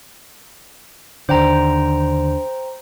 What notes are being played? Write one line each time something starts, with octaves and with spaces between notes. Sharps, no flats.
D#2 D3 C5 G5 A#5